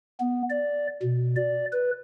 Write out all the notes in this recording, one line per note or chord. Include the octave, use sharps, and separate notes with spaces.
B3
D5
B2
D5
B4